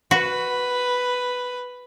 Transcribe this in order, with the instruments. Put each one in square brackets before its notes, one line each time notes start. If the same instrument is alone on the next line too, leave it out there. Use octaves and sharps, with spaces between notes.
[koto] F#4 [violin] B4